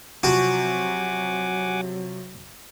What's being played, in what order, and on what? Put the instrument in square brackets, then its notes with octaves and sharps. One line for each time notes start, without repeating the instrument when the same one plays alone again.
[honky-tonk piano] C3 F3 [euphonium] F#3 [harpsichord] F#4 [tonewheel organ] F#5 G#5 D6